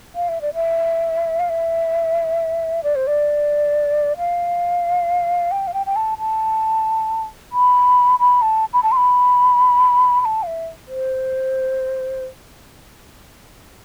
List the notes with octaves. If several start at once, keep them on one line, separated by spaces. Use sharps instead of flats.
F5
E5
D5
E5
F5
E5
D5
C5
D5
F5
G5
F5
G5
G5
A5
A5
B5
B5
A5
B5
A5
C6
B5
B5
A5
F5
E5
C5